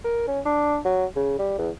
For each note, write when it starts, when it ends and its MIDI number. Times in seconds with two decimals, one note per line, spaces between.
0.04 0.26 70
0.28 0.40 61
0.45 0.78 62
0.85 1.05 54
1.16 1.37 49
1.39 1.56 55
1.58 1.70 40